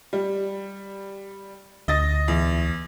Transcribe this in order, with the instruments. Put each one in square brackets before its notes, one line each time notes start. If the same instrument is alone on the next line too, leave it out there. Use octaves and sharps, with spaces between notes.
[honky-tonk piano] G3
[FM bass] D2 [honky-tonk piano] D#5 A6 A#6
[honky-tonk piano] E2